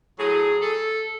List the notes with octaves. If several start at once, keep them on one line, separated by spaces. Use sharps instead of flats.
A2 F#3 G#4
A4